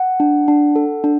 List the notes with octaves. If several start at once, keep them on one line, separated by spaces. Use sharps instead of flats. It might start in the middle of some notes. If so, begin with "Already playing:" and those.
Already playing: F#5
D4
D4
A4
D4